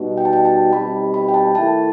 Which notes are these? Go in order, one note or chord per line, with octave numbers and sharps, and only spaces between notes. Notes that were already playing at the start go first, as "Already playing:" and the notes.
Already playing: B2 G3 D#4 F#4
G5
A5
G5
A5
B2 G3 C4 D#4 G4 B5
B5
G5
A5
D#3 A3 E4 A5